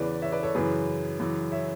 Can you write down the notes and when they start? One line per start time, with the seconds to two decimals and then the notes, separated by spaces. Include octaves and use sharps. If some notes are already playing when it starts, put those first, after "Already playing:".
Already playing: E2 C#3 E3 B4 D5
0.22 C#5 E5
0.32 B4 D5
0.43 A4 C#5
0.55 F#2 C#3 E3 G#4 B4
1.19 F#2 C#3 E3
1.52 C#5 E5